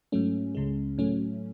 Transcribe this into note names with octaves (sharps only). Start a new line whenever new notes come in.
G#2 F#3 A3 C#4
C#2 C#3 G#3
A2 F#3 A3 C#4